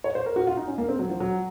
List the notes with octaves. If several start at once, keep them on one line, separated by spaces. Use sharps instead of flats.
C#5
C5
A#4
F#4
F4
D#4
C#4
A#3
C4
F#3
F3
F#3